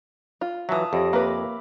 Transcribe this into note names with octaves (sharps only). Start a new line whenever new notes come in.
F4
E3 F#3 E5 A5 D#6
F2 G4 C#5 A#6
A#3 B4 E5 B5 D6